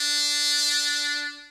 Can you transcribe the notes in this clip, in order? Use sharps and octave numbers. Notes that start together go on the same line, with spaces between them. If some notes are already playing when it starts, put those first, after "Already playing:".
Already playing: D4